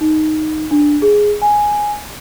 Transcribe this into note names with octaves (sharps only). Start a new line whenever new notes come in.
D#4
D4
G#4
G#5